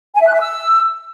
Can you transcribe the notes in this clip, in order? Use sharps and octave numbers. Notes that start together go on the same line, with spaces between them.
G#5
E5
F#6
E5
E6